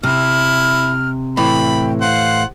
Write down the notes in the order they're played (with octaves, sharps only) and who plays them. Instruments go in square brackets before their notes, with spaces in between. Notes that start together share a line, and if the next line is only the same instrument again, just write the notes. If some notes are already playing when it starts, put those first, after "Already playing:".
[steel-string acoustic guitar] C3 [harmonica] E4 [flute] F6
[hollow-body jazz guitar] A2 E3 [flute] G5 [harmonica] B5
[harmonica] C5 F#5 [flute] F5